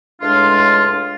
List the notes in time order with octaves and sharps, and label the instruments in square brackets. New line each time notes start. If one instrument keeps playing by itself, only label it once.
[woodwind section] C#2 A2 G#3 D4 F4